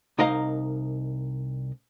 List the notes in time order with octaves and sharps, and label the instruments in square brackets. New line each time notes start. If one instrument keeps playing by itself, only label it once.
[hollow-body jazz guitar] C2 D#4 A#4 D#5 F5 A#5